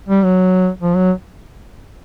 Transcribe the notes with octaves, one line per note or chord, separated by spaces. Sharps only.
G3
F#3
F3
F#3